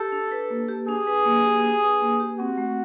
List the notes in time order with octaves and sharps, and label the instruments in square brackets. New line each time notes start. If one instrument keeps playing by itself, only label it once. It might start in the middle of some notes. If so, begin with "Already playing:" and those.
Already playing: [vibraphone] G4 [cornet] A4
[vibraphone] D4
B4
A#3
G4
[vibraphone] D4 [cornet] G#4
[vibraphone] B4
A#3
G4
D4
B4
A#3
G4
[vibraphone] C4 [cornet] F#4
[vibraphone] A3